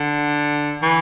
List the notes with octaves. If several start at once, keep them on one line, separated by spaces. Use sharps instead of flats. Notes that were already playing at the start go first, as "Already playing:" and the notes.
Already playing: D3
E3